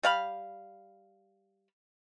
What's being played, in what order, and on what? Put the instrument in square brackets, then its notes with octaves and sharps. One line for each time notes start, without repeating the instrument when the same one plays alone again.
[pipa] G3 F5 B5